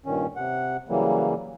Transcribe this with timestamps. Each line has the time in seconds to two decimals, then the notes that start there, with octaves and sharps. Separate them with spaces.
0.06 G2 A#2 D#3 C#4
0.36 C3 F#5
0.89 C#3 E3 F#3 G3 A#3